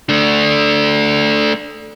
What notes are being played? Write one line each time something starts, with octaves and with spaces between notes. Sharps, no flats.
A3 D4